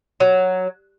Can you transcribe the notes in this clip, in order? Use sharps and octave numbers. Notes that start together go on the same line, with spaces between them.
F#3